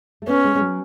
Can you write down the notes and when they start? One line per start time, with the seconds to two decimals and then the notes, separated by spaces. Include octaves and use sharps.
0.22 A3
0.27 B3 C#4
0.44 G#3
0.55 G#3
0.61 F#3